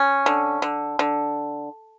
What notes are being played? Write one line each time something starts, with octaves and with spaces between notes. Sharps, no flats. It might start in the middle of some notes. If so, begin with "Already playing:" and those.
Already playing: C#4
D3
D3
D3